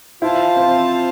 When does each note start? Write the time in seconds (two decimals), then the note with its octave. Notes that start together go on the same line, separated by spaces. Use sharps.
0.22 E4 F4 C5 F5 A5
0.56 C4